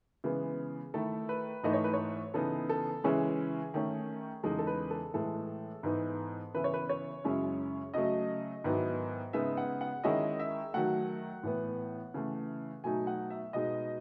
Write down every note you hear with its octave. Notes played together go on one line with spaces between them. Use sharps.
C#3 E3 G#3 B3
D#3 A3 E4 A4
B4
G#2 E3 A3 D#4 D#5
C#5
B4
C#5
C#3 E3 B3 D#4 A4
A4
C#3 E3 G#3 C#4 E4 G#4
D#3 A3 C#4
E2 C#3 G#3 D#4 A4
A4
B4
A4
A2 E3 G#3 A4
G#2 E3 B3 D#4
C#3 E3 B3 E4 B4
C#5
B4
C#5
F#2 C#3 G#3 C#4 E4
C#3 F#3 A3 D#5
G#2 D#3 F#3 B3 E4
C#3 G#3 B3 D#4 E5
F#5
F#5
D#3 G#3 C#4 E4 D#5
E5
D#3 F#3 A3 F#5
A2 E3 B3
C#3 E3 A3
B2 F#3 A3 D#4 G#5
F#5
E5
B2 G#3 D#4 D#5